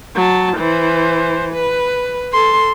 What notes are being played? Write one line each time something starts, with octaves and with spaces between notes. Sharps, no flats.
F#3 A5
E3 C5
B4
A4 C6